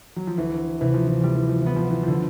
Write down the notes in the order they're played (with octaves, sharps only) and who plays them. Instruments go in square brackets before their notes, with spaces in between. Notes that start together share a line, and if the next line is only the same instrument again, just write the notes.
[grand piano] F#3
F3
[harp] D2 [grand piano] E3
[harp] C3 [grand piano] E3
[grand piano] F3
E3
[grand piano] F3 [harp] G3
[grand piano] E3
F3
[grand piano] E3 [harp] B3
[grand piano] F3
E3
[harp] D3 [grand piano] F3